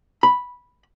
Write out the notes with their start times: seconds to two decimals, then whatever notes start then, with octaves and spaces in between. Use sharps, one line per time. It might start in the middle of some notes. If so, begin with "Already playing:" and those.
0.23 B5